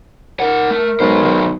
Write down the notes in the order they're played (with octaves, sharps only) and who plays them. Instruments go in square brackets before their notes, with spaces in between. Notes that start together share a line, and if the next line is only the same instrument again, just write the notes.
[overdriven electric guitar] D#4 F#5 [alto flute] A#4
[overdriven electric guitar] A3
[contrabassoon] B1 [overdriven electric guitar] G#3 C5
[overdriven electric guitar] D#3 F#3